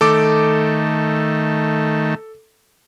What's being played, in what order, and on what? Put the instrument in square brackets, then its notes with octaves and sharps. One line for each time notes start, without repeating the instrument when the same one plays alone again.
[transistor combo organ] D#3 A3 [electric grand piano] A4 D6